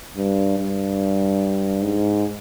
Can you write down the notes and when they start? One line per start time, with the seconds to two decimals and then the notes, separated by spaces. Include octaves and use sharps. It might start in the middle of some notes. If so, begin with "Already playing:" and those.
0.17 G2
0.58 G2
1.82 G#2